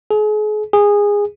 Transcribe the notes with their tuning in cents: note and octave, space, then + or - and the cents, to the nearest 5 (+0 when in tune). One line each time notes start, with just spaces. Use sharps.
G#4 +40
G#4 -15